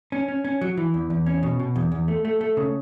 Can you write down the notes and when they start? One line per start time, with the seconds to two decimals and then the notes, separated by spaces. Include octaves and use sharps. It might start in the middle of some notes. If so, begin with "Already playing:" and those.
0.12 C#4
0.28 C#4
0.45 C#4
0.61 F#3
0.77 E3
0.94 E2
1.10 E2
1.26 C#4
1.43 B2
1.60 B2
1.76 E2
1.92 E2
2.08 A3
2.25 A3
2.41 A3
2.57 C#3